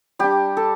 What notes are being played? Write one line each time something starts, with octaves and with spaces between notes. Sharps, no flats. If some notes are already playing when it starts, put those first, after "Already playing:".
G3 D4 G4
A4